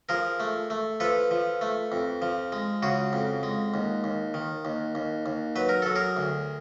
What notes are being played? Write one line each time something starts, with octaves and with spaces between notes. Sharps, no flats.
F3 G#4 A#4
A3
A3
F3 A4 B4
F3
A3
F2
F3
G#3
C#3 F#4 G#4
F2
G#3
D#2
D#2
D#3
D#2
D#2
D#2
F#3 B4
A#4
F#3 A4
G#4 A#4
D2